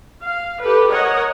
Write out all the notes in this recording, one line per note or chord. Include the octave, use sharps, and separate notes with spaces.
F5
G4 A4 B4
A#4 C#5 D#5 F#5